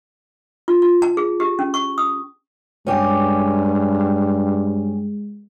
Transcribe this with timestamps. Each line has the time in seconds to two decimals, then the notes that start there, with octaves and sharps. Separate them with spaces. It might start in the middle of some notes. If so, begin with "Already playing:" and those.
0.68 F4
0.82 F4
1.02 A5
1.17 G#4
1.40 G4
1.59 C#4
1.74 C#6
1.98 D#6
2.87 G2 G#3 C#4 G4